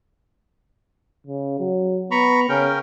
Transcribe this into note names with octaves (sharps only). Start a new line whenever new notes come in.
C#3
F#3
B3 A#5 B5 C#6
C#3 C#4 A#4 G5